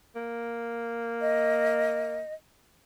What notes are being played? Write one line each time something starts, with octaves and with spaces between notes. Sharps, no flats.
A#3
D#5